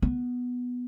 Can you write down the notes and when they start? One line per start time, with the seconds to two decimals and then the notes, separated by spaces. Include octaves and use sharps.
0.02 B3